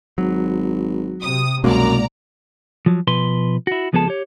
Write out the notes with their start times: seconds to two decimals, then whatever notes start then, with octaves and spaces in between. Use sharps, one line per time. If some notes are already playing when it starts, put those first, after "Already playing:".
0.18 G#1 F#3
1.22 C3 D#6
1.64 C2 F#2 B2 G#3 A#3 D5 A#5
2.86 F3 F#3
3.07 B2 F3 B4 C6
3.67 E4 F#4
3.93 C#2 F3 B3 G#4 A4 A5
4.08 G4 C#5